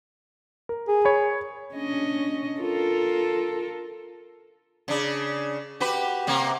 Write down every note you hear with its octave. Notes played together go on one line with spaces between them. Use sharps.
A#4
G#4
C#5 B5
C#4 D4 D#5
F4 A4 A#4
C#3 D4
F#4 G4 B4
C3 A#3